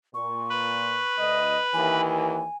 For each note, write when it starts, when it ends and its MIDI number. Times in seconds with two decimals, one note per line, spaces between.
0.14 1.01 46
0.14 1.16 85
0.50 2.01 71
1.17 1.56 38
1.17 1.56 75
1.74 2.44 39
1.74 2.44 52
1.74 2.57 80